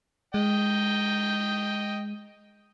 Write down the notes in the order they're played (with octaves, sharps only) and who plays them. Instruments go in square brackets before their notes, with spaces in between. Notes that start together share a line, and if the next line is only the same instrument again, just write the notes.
[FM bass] G#3 [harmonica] D#5 G5